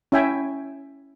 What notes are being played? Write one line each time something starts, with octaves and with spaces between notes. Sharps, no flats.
C#4 E4 E5 G5 G#5